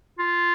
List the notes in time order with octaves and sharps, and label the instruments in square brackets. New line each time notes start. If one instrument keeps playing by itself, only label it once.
[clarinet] F4